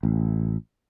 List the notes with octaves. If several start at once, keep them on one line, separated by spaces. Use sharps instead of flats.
A1